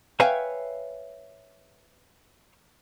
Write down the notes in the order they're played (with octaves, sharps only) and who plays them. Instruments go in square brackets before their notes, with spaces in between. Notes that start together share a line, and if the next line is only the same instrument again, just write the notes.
[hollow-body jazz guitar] B4 C#5 E5 F5 G5 G#5